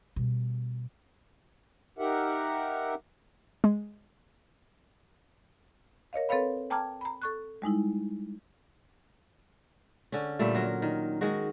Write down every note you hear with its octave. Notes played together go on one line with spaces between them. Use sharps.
B2 G3
D#4 G4 A#4 E5 F#5
G#3
A#4 C#5 D#5 F5
C4 A4 B4 C#5 F5 B5
G5 A5 A#5 D6 F6 G#6
A#5 B5
A4 C#6 F#6
G3 G#3 D#4 E4
D3 C#4
A#2 G3 A3
F#3 A#4
D#3
D#3 G#3 F#4